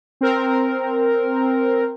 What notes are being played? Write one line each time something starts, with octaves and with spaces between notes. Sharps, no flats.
C4 A#4